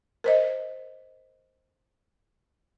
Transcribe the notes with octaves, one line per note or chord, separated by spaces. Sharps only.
A#4 C5 D#5